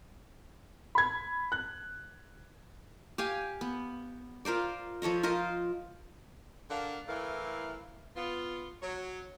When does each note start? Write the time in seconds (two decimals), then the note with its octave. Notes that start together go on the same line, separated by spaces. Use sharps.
0.95 B5 G#6
1.52 F#6
3.18 G4 F5 G#5
3.61 B3
4.45 F4 A#4 C5 D5
5.02 F3 A4 C#5 D#5
5.23 F4 A#4 C5 D#5
6.70 D3 D4 A#4 F5 F#5
7.08 A2 E3 A3 A#4 F5
8.16 B3 F4
8.82 F#3 C#5